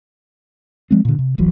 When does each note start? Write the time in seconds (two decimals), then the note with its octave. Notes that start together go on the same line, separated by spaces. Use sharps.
0.91 F3 G#3 C4
1.05 A#2 D3
1.19 C3
1.38 D1 A1 E3 F#3